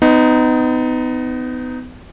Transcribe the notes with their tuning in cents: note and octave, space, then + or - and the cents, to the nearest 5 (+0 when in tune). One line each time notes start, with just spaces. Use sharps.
B3 +35 D#4 +0